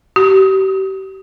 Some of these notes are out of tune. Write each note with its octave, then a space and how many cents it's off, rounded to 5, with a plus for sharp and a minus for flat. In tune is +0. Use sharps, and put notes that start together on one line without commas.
G4 -35